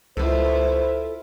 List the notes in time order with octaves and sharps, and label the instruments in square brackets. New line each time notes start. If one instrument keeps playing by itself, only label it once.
[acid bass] C#2 [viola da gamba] E4 F4 [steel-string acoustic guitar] A4 B4 [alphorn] C5